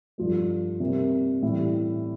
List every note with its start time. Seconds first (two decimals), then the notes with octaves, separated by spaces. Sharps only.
0.18 G2 F3 A3
0.80 C3 G3 A#3
1.42 A2 E3 G3